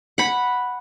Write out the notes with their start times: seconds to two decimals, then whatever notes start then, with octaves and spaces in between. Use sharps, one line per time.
0.18 F#5 B5